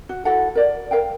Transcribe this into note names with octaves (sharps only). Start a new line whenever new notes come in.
F#4
E4 F#4 A4 F#5
A#4 D5
A#4 F5 G5